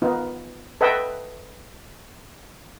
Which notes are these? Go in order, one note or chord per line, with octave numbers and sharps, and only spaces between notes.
B3 D#4 F4
A4 B4 D#5 E5 F#5 G5